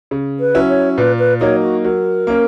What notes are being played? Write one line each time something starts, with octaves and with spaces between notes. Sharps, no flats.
C#3
B4
F#3 C#4 E4
C#5
A#2 B4
B4
F#3 A#3 D#4 C#5
F#4
F#3 A#4
A#3 C#4